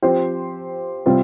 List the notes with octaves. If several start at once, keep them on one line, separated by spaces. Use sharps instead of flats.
F3 C4 G4 C5
C3 G3 C4 F4